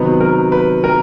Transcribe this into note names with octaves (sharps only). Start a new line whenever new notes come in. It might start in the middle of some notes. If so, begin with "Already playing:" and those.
Already playing: C3 D#3 F#3 B3 B4
A#4
B4
A#4